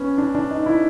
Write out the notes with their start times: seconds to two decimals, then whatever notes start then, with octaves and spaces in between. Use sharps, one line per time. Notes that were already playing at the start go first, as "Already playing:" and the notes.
Already playing: B3 C#4
0.18 D4
0.35 D4
0.51 D#4
0.66 E4